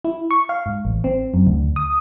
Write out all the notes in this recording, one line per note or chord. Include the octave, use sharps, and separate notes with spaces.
E4
C#6
F5
G#2
A1
C4
F#2
D2
D#6